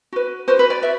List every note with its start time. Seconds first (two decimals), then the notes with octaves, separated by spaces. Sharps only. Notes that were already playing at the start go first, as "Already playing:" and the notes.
0.12 F#4 B4
0.48 F#4 B4 C5
0.59 B4
0.70 D5
0.82 F#4 B4 E5